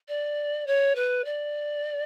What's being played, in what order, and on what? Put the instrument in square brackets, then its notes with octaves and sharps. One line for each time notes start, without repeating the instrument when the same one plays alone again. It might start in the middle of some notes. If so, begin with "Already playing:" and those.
[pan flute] D5
C#5
B4
D5